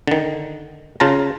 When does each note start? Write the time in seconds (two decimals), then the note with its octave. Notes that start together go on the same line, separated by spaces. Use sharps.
0.07 D3 D#3
1.00 C#3 F4 A5 A#5